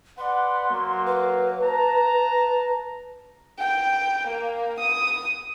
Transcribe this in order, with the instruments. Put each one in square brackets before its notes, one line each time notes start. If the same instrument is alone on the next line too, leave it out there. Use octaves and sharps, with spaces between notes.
[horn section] B4 D5 F#5 [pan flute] C6
[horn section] F#3 A#3
[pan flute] B4
[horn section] A5 A#5
[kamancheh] G5
A#3
D#6